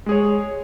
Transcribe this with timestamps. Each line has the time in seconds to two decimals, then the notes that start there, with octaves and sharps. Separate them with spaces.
0.06 G#3
0.09 G#4
0.12 C#5